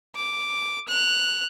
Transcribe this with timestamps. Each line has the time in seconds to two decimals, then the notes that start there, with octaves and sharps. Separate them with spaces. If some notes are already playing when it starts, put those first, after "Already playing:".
0.16 D6
0.88 F#6 F7